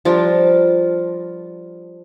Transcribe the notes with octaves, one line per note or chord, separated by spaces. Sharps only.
F3 G3 D4 A#4